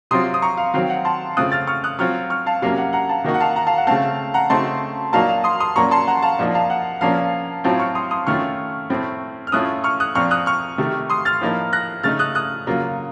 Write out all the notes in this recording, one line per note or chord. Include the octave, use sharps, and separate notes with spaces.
C3 F#3 C4 F4 C6 D#6
D#6
A#5 C#6
F5
D#3 F#3 C4 F5
F#5
A5 C6
C#3 A3 C4 F4 D#6 F#6
F6 A6
C#6 F6
D#6 F#6
F#3 C4 F4 C#6 F6
C#6 F6
F5 A5
C3 F#3 A#3 C#4 F5
F#5
F#5 A#5
F5 A5
D#3 A#3 D#4 F#4
F#5
F5 A5
F#5 A#5
F5 A5
F#5
C#3 A3 C4 F5 A5
F#5 A#5
C#3 A3 C4 D#4 F#4 A5 C6
A#2 F#3 A#3 D#4 F#4 F5 A5
F5
C6 D#6
C6 D#6
A#2 F#3 A#3 C#4 F#4 A#5 C#6
A5 C6
F#5 A#5
F5 A5
A#2 F3 A#3 D#4
F5 A5
F#5
A#2 F3 A#3 C#4 F5 A5
A2 F#3 C4 F4 F5 A5
C#6 F6
C6 D#6
C6 D#6
D#3 A3 C#4 F4 C#6 F6
A2 A3 C4
F6
A2 A3 C#4 F4 D#6 F#6
C#6 F6
D#6 F#6
A#2 F3 C4 C#6 F6
D#6 F#6
C#6 F6
C3 D#3 A3
C6 D#6
F6 A6
A2 F3 A#3 D#4
F#6 A#6
C#3 A3 D#4 F6 A6
D#6 F#6
D#6 F#6
C#3 F#3 A#3 F4